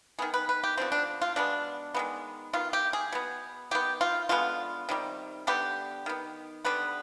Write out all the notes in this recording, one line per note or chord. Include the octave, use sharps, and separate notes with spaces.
D#3 B3 G#4
B4
B4
G4
D3 F3 B3 C4
D4
F4
B2 G#3 B3 D4
D#3 G#3 B3
D#3 B3 F4
G4
G#4
B2 B3
D#3 B3 G4
F4
D3 G#3 B3 F4
C3 D#3 G3
D3 G3 B3 G4
D#3 B3
D3 G3 B3 B4